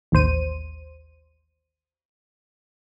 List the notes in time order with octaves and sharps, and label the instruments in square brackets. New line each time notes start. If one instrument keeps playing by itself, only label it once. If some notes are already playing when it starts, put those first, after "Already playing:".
[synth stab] A1 D#2 C5 D#7